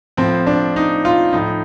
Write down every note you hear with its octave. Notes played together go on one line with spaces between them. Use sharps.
A2 F3 C4
D4
D#4
F4
A2 F3 D#4